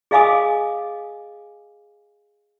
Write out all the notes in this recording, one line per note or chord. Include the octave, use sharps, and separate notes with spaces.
G#4 D#5 F5 G#5 D6 D#6